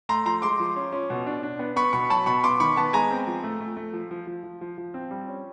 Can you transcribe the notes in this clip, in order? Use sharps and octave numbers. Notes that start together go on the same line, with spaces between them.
A3 A#5 C6
F3 A#5 C6
G#3 C6 D6
F3
C#4
C#4
B2
D4
D4
B3
B3 B5 C#6
B2 B5 C#6
F#3 A5 B5
B2 B5 C#6
B3 C6 D6
D#3 B5 C#6
B3 A5 B5
G#3 G#5 A#5
C4
F3
A3
A3
A3
F3
F3
F3
F3
F3
F3
C4
G3
C#4